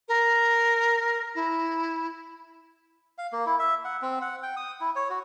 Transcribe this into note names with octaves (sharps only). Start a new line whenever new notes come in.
A#4
E4
F5
A#3
E4
E5
F#5
C4
F#5
G5
D#6
E4
C#5
F#4